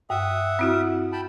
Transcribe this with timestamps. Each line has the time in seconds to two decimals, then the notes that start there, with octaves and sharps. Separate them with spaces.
0.10 G2 E5 F#5 D#6
0.59 C4 E4 F#4
1.12 G5 A5 B5